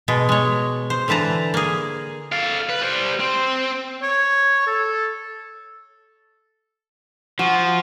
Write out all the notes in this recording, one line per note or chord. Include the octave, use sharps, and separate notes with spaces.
B2 G#3
G#3 C#5
C5
D3 E3 B4 A5 A#5
A#3 G#4
A4 F5
B4
G3 C5
C4
C#5
A4
F3 F#4